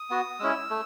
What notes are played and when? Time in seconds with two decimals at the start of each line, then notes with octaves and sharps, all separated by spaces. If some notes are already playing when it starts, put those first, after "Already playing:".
Already playing: D#6
0.10 B3 F#4
0.40 G#3 C#4 E4 E6
0.70 A3